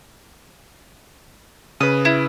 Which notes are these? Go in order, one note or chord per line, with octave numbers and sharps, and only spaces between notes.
C#3 B4 D#6
E4